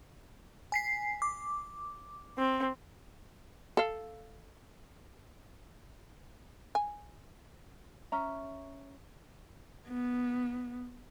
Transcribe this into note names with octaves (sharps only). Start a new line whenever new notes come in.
G#5 B6 C7
D6
C4
A4 F5
G#5
C#4 E5 A#5
B3